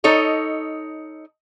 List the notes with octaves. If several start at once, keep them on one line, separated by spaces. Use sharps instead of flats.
D#4 A4 C#5 D#5